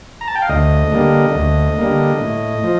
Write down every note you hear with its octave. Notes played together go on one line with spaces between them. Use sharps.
A#5
A5
G5
F5
D2 D#5
D3 G3 A#3
D2
D3 G3 A#3
A2
F3